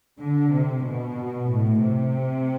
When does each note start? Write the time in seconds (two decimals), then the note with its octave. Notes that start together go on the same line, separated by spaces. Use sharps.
0.19 D3
0.52 C3
0.84 B2
1.50 A2
1.82 C3